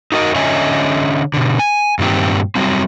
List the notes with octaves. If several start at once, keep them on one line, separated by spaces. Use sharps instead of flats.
D#4 F#4 A#4 D#5
D3 C#4 C#5 D#5 E5 G#5
B2 D3
G#5
G2 A#2 D#3 C4 G4
F#3 G3 C4